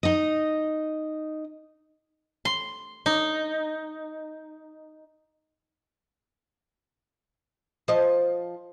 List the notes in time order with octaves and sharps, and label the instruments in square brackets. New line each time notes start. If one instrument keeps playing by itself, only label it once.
[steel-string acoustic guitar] D#4 D#5
[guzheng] C6
D#4
[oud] F3 C5 D#5